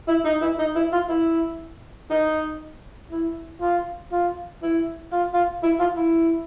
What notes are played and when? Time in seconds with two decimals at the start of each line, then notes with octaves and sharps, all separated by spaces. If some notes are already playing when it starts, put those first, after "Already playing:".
0.08 E4
0.25 D#4
0.42 E4
0.59 D#4
0.76 E4
0.93 F4
1.09 E4
2.10 D#4
3.11 E4
3.61 F4
4.12 F4
4.62 E4
5.12 F4
5.34 F4
5.63 E4
5.80 F4
5.96 E4